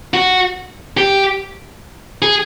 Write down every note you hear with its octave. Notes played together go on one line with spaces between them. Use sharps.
F#4
G4
G#4